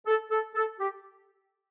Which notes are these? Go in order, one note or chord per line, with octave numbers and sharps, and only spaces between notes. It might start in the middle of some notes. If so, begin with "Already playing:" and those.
A4
A4
A4
G4